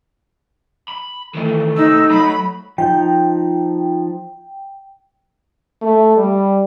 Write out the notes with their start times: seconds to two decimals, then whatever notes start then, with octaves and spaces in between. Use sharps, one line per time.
0.89 B5
1.34 D#3 E3 A3
1.76 C3 D#4 E6
2.11 F#3 B5
2.78 F3 D#4 G5 G6
5.81 A3
6.16 G3